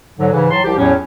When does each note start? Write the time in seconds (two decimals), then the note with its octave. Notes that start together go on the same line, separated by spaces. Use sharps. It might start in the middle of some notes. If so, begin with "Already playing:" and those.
0.18 G#2 D3 F#3
0.33 G#2 C#3 E3
0.50 A2 F#3 A5 C6
0.64 C2 F3 G4
0.77 E2 A2 F#3 C#4